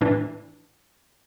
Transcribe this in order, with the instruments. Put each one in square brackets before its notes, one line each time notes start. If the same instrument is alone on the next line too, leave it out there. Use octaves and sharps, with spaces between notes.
[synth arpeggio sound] A2 E3 D4